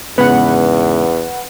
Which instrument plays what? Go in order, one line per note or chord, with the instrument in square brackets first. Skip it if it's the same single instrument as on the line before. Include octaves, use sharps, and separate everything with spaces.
[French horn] E2 [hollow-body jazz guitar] G#2 C#3 B3 [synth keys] B4 F#5